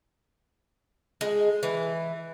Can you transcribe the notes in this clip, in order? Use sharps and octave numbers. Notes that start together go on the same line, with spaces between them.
G#3
E3